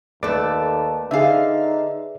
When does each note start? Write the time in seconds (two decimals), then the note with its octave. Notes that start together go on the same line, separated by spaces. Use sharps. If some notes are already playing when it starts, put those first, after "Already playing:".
0.23 D#2 A3 A4 B4 D5 D6
1.11 D3 D#4 G#4 E5 F5